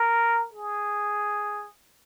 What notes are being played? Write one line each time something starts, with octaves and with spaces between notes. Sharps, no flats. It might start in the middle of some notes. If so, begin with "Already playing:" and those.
Already playing: A#4
G#4